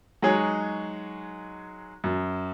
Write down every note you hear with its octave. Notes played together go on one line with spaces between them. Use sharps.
F#3 G#3 D#4 G#4 C#5
F#2